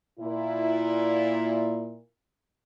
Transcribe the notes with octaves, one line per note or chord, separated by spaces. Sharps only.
A#2 E4